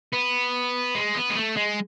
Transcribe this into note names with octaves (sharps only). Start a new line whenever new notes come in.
B3
G#3
B3
G#3
A3
G#3